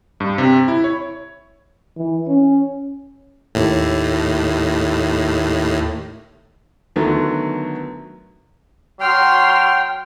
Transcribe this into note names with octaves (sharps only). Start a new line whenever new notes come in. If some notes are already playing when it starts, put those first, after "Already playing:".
G2
C3
E4
C#5
E3
C#4
D#2 A2
D3 D#3 F#3 A3 B3
F#3 G5 C6 F6